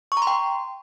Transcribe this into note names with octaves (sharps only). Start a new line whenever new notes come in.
C#6
A#5
C6
G5